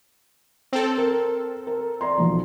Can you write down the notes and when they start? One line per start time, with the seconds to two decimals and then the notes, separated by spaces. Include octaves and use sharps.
0.73 C4 A4
0.98 A#4
1.67 A#4
2.01 D5 A#5 C6
2.18 B1 F3